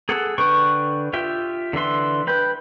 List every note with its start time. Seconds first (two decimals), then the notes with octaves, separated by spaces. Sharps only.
0.09 G#4 A4 F#5
0.38 D3 B4 G5 C#6
1.13 F4 G4 E5 G5
1.73 D3 E3 E5 C6
2.27 B4 G5